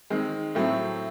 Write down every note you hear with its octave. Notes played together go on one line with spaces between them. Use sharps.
D#3 G#3 C4
A2 F#3 A3 C4